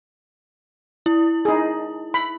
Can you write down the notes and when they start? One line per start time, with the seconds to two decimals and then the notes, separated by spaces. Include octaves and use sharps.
1.06 E4
1.45 D#4 G#4
2.14 B5